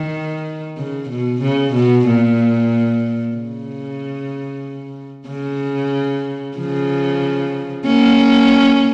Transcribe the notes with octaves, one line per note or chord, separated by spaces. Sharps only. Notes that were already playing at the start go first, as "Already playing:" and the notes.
Already playing: D#3
C#3
B2
C#3
B2
A#2
C#3
C#3
C#3 F3
A#3 C#4